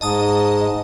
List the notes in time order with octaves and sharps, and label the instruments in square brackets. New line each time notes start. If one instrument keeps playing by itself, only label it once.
[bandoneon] G#2 [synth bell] D#5 A5 D#6